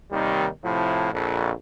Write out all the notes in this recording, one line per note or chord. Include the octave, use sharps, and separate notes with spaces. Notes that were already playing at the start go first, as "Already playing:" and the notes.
D#2 C3 D#3 G3
A2 C3 F3 E4
A#1 F2